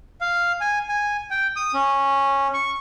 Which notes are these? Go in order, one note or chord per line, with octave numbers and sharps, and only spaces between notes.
F5
G#5
G#5
G5
D#6
C#4
C#6